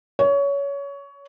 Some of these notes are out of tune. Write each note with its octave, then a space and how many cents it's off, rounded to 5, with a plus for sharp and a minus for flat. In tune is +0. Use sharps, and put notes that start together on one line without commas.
C#5 +20